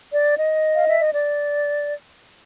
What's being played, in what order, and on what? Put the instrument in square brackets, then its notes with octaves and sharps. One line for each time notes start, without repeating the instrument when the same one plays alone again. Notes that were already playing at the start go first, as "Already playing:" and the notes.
[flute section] D5
D#5
F5
E5
D#5
D5